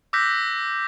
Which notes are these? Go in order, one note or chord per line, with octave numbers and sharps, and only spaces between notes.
D6 E6 F#6 G6 A#6 B6